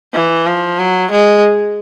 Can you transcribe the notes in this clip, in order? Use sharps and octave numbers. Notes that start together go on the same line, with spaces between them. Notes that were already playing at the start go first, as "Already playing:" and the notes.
E3
F3
F#3
G#3